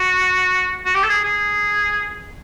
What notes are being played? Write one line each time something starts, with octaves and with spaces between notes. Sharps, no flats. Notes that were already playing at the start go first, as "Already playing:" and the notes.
Already playing: F#4
F#4
G4
A4
G#4
G#4